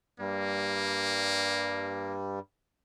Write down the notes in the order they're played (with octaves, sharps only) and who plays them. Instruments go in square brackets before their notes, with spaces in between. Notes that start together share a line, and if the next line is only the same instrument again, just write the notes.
[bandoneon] G2 G3 [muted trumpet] A#3